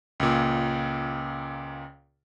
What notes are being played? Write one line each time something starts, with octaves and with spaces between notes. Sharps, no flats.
C#2 A#2